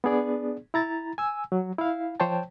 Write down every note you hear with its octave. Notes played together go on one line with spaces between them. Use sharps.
B3 D4 G#4 D5
E4 A#5 A6
G#5 E6
F#3
E4 F5
F3 C5 C#5 G5 A5